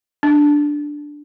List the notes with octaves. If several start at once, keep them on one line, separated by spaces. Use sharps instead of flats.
D4